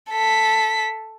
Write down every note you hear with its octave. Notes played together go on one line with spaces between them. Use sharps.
A4 B6